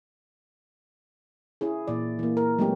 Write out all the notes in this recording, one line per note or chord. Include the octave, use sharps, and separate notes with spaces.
C#4 E4 G#4
A#2 E3 D5
E3 A#3
A#4
F#3 G#3 A3 B3 C#4 G4